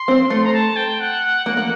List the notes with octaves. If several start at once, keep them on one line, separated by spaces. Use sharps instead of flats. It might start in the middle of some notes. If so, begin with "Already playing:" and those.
Already playing: C6
C4
A3
A#5
A5
G5
F#5
A#3
A#3